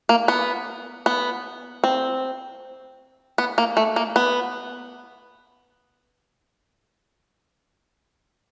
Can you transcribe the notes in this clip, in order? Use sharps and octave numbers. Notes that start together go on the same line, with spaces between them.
A#3
B3
B3
C4
B3
A#3
A3
A#3
B3